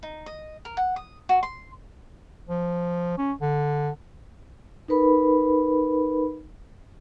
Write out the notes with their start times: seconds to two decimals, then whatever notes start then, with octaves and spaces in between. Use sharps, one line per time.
0.03 D#4
0.26 D#5
0.65 A#4
0.77 F#5
0.96 D#6
1.29 F#4
1.43 C6
2.49 F3
3.18 C#4
3.41 D3
4.88 D#4 A#4 B4 B5